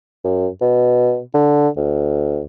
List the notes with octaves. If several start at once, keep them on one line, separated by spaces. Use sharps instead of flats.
F#2
B2
D3
D2